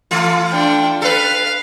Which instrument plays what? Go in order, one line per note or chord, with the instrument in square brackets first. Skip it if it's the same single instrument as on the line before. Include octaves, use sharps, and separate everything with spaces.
[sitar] E3 A3 F4
[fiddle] D4 G5
[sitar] A4 B4 [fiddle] F5